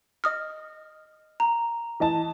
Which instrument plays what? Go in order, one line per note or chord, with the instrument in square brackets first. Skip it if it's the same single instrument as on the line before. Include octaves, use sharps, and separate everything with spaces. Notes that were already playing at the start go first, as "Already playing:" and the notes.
[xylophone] D#5 D#6 F6
A#5
[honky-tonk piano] E3 D#5 A5